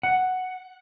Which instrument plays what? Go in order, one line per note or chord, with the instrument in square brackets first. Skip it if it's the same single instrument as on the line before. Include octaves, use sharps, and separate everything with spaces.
[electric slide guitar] F#5